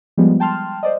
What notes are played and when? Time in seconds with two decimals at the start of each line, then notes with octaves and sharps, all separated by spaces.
0.17 F3 G3 G#3 B3
0.40 G5 A5 C6 F6
0.83 C5 D5 D#5